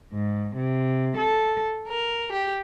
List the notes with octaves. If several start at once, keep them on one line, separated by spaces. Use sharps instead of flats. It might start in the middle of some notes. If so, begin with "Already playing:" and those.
G#2
C3
A4
A#4
G4